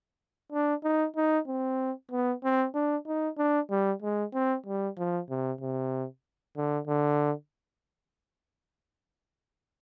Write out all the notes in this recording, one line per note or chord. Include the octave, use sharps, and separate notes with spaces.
D4
D#4
D#4
C4
B3
C4
D4
D#4
D4
G3
G#3
C4
G3
F3
C3
C3
D3
D3